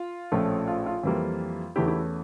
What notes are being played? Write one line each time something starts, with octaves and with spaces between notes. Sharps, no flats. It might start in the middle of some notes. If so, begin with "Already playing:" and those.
Already playing: F4
A#1 A2 F3 A3 C#4
F4
F4
F2 E3 G3 A#3
E2 E3 A3 C#4 E4 G4
E4 G4